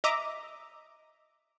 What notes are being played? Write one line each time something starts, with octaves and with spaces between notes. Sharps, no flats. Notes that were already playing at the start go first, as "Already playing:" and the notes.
D#5 E5 A#5 D6